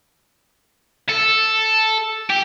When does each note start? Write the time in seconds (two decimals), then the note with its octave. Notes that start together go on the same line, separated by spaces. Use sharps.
1.09 A4
2.30 G4